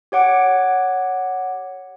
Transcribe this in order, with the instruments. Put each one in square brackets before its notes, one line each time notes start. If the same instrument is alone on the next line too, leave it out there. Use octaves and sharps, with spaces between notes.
[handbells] G4 C#5 F#5 D6 D7